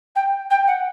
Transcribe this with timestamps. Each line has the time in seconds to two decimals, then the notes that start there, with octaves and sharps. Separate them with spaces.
0.15 G5
0.50 G5
0.67 F#5